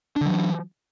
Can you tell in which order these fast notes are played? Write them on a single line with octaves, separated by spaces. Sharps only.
D4 D3 F#3 E3